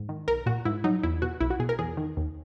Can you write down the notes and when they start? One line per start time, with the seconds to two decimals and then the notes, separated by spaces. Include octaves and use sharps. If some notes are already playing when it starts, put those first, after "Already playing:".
Already playing: G#2
0.09 D#3
0.28 B1 A#4
0.46 A#2 F#4
0.65 G#2 E4
0.84 F#3 D#4
1.03 E2 E4
1.22 B2 F#4
1.40 B1 E4
1.50 F#4
1.59 B2 G#4
1.69 A#4
1.79 E2 G#4
1.97 D#3
2.17 D#2